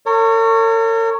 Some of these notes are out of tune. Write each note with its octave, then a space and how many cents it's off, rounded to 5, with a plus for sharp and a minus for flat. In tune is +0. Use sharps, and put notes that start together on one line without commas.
A#4 -45 C#5 +0